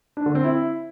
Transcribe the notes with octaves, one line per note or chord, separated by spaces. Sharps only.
D4
D3
C4
E4